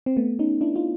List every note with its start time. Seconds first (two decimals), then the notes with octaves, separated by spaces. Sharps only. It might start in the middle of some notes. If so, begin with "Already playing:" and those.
0.06 C4
0.17 A3 B3
0.39 C#4 D#4
0.61 D4 E4
0.76 D#4 F4